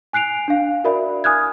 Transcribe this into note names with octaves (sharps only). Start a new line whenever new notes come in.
G#5 F#6 C7 D7 F7
D4 F5
F#4 A#4 D5 E5 B5
G#5 D#6 F6 F#6 G#6